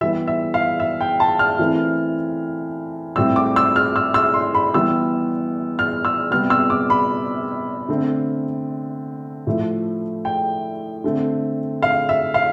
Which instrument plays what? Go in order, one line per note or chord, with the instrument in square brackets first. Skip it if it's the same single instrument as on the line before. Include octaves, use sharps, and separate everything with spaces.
[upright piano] E3 G3 B3 E5
E5
F5
E5
G5
A5
F6
E3 A3 C4
A2 G3 C4 E6
D6
E6
F6
E6
E6
C6
B5
E3 G3 B3 E6
F6
E6
C3 G3 B3 F6
E6
D6
B5
D3 A3 C4
A2 F3 A3
G5
D3 A3 C4
F5
E5
F5